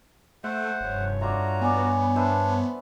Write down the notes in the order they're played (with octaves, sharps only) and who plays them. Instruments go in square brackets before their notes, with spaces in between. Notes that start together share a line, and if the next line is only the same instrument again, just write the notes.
[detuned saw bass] A3 [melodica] C5 F#5 [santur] E5
[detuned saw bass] F1 [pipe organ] G2 C#5
[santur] A3 D4 [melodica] F4 F#4 A#5
[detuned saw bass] B3 [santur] D5 G#5
[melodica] D4 [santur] B4 C5 E5